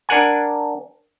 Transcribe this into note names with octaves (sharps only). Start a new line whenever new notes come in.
D4 A#4 F#5 G#5